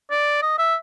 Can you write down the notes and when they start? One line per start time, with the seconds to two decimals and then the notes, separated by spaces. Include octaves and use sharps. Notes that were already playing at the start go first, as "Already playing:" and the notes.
0.10 D5
0.42 D#5
0.58 E5